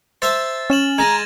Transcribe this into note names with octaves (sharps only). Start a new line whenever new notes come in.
C5 E5 A5 A6
C#4 F6 E7 F#7
G#3 A#5 G#6 A#6 D#7